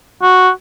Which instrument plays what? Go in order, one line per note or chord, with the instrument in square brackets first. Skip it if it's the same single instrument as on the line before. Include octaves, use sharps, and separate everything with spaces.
[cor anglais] F#4